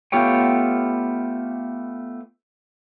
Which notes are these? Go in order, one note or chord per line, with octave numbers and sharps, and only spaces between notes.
A3 B3 F4 G4 C#5 G5